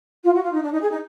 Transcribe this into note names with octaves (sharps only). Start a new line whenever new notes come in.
F4
F#4
F4
D#4
D4
D#4
G#4
D#4